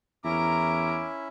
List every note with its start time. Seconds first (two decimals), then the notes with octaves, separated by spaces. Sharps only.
0.24 E2 C#4 E4 A#4 E5 A#5 D6